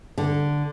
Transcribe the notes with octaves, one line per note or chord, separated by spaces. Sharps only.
D3